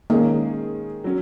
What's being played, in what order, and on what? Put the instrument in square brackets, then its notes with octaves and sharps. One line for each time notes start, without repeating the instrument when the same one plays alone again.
[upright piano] D#3 G#3 C#4 G#4 [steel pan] A#3
[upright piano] F#3 C#4